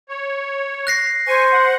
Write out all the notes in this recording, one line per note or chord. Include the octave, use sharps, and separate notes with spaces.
C#5
F#6 A#6 C7
C5 G#5 C#6
F#5